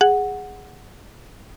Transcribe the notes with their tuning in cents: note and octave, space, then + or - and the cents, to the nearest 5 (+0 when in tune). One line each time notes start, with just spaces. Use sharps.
G#4 -10 F#5 +0